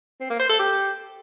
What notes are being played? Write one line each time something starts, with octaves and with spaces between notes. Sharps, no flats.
C4
A#3
C5
A4
G4